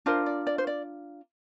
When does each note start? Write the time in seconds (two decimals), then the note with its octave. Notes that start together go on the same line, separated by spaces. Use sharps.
0.06 D4 F4 A#4 C5
0.26 D5
0.47 D5
0.58 C5
0.67 D5